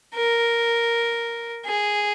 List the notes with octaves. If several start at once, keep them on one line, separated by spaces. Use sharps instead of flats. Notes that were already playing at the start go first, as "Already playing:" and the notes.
A#4
G#4